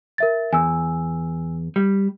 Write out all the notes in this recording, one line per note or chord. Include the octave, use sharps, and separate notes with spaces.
A#4 E5 A6
E2 G#5 E6
G3